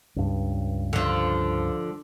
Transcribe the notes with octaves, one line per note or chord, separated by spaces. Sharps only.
C#2 G2
D3 F3